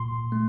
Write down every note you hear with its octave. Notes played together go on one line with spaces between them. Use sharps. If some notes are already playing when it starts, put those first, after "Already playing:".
Already playing: A#2 C6
A3